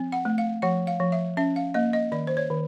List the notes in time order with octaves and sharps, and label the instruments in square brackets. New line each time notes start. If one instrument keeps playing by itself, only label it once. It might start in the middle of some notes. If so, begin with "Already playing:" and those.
Already playing: [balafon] F3 C4
F#5
A3
F5
F3 F#5
F5
F3
E5
C#4 E5
F5
A#3 D#5
D#5
D#3 D5
C5
C#5
D#3